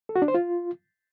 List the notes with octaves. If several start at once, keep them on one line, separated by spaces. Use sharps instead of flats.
A4
F#4
D4
C5
F4